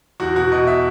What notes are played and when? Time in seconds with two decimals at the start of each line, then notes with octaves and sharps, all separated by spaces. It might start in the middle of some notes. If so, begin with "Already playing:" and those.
0.20 E2 F#4
0.36 B2 F#4
0.52 B2 D#5
0.67 E5